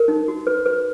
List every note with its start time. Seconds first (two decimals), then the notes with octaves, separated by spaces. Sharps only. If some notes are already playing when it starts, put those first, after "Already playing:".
Already playing: A#4
0.08 D#4
0.28 F#4
0.47 B4
0.66 B4